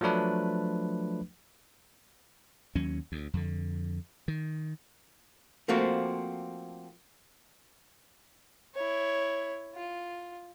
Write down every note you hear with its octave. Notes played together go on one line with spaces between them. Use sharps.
F3 F#3 A3 D4 B4
D#2 F#3 C#4
D2
F2 D3
D#3
F3 A3 A#3 C4 F#4
E4 C#5
F4